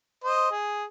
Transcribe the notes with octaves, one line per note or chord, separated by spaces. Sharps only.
C5 D#5
G#4